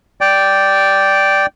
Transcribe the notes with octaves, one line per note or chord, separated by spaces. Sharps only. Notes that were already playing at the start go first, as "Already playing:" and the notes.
D5 G5